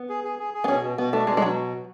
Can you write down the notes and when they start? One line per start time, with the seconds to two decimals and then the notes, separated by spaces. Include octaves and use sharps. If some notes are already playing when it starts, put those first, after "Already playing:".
Already playing: B3
0.09 G#4
0.24 G#4
0.39 G#4
0.54 G#4
0.64 B3
0.68 B2 C#4
0.83 B2
0.98 B2 B3
1.13 A3 D4
1.27 B2 G#3
1.37 G#3
1.42 B2 F#3